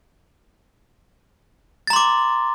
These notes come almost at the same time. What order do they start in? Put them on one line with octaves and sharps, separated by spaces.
A6 A#5 C6 D6